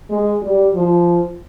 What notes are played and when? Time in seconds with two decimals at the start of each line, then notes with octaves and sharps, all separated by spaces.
0.10 G#3
0.42 G3
0.74 F3